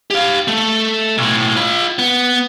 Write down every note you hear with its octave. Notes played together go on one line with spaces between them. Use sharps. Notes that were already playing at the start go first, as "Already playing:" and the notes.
G4 F5
A3 A4
B1 A2
F4 B5
B3